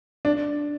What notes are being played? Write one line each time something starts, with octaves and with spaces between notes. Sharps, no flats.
D4